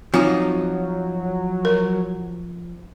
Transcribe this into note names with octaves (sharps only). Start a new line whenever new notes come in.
F3 F#3 C4 D#4 F4
A#4